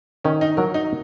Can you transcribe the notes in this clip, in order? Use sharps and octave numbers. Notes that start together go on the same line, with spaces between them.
D#3 C#4
D#4
F#3 A#4
D#4